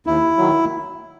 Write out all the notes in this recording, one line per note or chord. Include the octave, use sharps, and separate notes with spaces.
D#2 E4
D#3 F#3